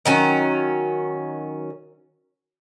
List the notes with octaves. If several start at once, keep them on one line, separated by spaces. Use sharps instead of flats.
D#3 F#3 C#4